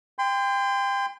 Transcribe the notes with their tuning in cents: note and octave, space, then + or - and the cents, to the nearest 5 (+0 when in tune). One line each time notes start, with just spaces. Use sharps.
G5 +25 C6 -30